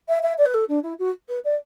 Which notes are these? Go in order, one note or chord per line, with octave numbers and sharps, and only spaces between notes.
E5
E5
D5
B4
A4
D4
E4
F#4
B4
D5